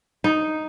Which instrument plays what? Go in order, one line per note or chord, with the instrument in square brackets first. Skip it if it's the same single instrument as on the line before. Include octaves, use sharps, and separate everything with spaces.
[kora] D#4